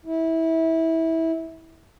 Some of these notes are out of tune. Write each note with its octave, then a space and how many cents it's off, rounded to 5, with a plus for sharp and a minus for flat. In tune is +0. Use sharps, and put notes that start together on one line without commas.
E4 -20